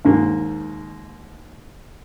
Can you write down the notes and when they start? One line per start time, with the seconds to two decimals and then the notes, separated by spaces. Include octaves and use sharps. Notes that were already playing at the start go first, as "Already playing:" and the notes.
0.05 D#2 G#2 A#3